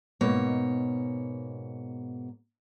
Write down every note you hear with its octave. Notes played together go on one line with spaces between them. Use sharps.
G#2 B2 A#3 C#5